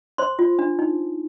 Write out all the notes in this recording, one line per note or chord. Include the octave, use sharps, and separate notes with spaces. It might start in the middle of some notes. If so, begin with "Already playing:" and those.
C5 C6
F4
D4
D#4